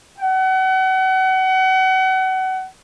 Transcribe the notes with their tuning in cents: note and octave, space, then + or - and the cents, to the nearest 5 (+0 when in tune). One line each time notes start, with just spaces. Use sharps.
F#5 +35